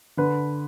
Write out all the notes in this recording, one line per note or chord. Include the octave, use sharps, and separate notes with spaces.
D3 B4